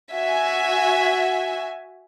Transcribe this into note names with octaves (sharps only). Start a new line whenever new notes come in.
F#4 E5 G#5